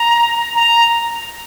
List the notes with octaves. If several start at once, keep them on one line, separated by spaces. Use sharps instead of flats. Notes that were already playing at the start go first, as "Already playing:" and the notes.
Already playing: A#5
A#5